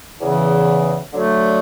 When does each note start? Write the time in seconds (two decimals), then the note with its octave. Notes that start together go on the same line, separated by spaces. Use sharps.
0.20 E2 C#3 E3
1.13 D3 F#3 A3